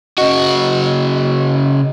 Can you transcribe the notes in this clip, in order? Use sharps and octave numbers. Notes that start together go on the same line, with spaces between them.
C#3 F#4 D#5